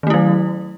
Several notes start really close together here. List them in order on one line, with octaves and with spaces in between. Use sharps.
D#3 A3 E4 F#3